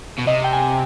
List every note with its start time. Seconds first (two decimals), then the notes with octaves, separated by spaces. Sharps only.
0.18 B2
0.27 C3 D#5
0.44 G5
0.53 G#5